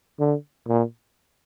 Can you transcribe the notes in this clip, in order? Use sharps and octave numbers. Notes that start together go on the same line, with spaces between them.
D3
A#2